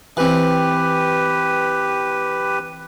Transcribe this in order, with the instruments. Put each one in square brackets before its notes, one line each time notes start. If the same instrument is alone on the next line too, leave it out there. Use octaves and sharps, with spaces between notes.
[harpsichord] E3 C4 [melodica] G4 B4